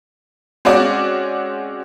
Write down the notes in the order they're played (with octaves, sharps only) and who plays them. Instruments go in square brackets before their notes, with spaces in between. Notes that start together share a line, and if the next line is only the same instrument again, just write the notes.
[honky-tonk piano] G#3 C4 C#4 F#4 D5